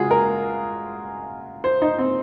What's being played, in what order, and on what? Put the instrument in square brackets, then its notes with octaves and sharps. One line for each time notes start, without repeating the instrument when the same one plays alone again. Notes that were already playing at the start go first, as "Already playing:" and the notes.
Already playing: [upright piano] C#3 G#3 F4 F#4 G#4
A#4
C5
D#4
C4